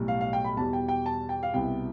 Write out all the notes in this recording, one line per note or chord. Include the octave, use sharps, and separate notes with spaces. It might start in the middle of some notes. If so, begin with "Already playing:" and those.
Already playing: B1 A2 G3
F5
F5
G5
B5
E2 B2 G3 A5
G5
G5
A5
G5
F5
C2 B2 B3 E4 G5